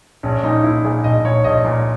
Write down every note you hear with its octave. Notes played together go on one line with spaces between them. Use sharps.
A#1 C#4
A#2 D#4
A#1 E4
A#2 G#4
A#1 D#5
A#2 C#5
A#1 D#5
A#2